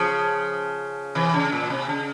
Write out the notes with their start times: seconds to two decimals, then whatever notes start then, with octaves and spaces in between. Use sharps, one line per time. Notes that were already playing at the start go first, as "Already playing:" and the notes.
Already playing: C#3 F3
1.15 C3 E3
1.34 C#3
1.52 A#2
1.70 C3
1.89 C#3